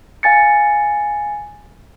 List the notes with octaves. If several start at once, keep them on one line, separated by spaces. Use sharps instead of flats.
F5 G#5 A6 C#7